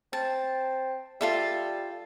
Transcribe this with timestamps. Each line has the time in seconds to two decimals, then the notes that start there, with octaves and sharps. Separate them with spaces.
0.13 C4 A5
1.21 G3 F4 A4 E5